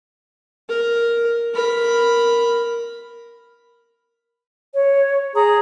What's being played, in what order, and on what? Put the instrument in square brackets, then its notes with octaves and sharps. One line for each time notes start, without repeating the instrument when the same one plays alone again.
[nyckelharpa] A#4
A#4 B5
[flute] C#5
[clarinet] G#4 [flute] A#5